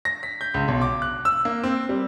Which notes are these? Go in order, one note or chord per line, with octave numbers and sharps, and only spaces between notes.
A#6
B6
G6
C#2
B1
D6
F#6
E6
A#3
C4
G3